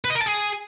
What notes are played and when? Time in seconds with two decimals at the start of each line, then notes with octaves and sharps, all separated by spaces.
0.05 B4
0.10 D#5
0.15 A#4
0.21 A5
0.26 G#4